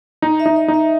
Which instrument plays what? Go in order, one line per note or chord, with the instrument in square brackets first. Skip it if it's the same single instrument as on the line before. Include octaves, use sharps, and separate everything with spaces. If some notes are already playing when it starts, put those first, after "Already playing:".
[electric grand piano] D#4
[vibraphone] E5
[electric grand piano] D#4
[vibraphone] D#5
[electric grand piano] D#4
[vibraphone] E5